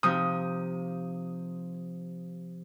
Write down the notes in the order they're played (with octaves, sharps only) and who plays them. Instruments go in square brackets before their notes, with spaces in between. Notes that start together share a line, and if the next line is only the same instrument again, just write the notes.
[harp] C3 F3 D#4 [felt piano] D#6